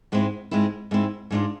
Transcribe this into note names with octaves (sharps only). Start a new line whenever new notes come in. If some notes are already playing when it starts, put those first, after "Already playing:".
G#2 G#3 C4 E4
G#2 G#3 C4 E4
G#2 G#3 C4 E4
G#2 G#3 D4 F4